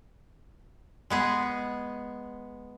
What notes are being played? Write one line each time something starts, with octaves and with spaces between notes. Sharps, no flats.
G#3 B3 G#4